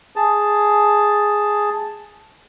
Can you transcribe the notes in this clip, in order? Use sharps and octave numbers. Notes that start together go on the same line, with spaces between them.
G#4 A5